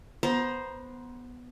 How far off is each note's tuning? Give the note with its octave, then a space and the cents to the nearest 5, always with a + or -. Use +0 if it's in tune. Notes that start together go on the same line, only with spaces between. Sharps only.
B3 -5 C5 +0 A#5 +20